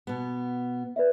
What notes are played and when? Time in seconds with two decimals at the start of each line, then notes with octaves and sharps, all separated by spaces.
0.07 B2 B3
0.96 B4 D5 E5